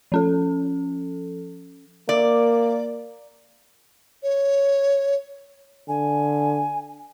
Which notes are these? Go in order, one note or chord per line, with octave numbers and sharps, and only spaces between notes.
F3 C#4 A4
A#3 D5
C#5
D3 G#5